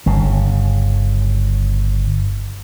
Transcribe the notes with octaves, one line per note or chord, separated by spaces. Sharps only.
G1 C#3